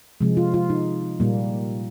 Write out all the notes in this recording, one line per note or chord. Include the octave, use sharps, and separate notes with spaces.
C3 F3 G#3
F4
F4
D#4
A#2 G3 A#3